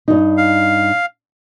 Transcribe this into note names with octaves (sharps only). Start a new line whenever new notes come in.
G2 D#4
F5